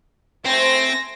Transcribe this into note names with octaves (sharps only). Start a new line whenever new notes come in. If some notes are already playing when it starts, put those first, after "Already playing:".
A3 C4 C5 G#5 A#6